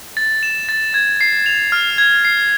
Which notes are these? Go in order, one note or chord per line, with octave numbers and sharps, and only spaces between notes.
A6
E7
A6
G#6
C7
F7
F6
G#6
C7